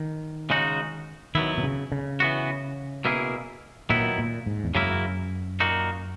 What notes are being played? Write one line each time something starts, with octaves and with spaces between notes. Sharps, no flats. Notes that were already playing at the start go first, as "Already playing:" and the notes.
Already playing: D#3
C#3 G#3 D#4 F#4
D#3 F#3 B3 E4
B2
C#3
C#3
E3 B3 F#4
B2 A#3 E4 G#4
A#2 D#3 F#3 B3 E4
A#2
G#2
E2
F#2 C#3 F#3 A#3 E4
A#2 A#3 D#4 F#4